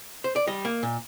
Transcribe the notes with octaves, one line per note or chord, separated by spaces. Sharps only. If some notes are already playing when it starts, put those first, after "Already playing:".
C5
D5
G3 D#5
A#3
A#2